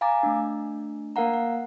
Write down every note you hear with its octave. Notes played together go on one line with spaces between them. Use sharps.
F5 G#5 A#5 D6 A6
A3 D4
A#3 A#4 F5 F#5 A#5
F#5